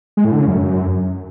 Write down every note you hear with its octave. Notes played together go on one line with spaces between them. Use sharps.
G#3
A2
D3
C#3
F#2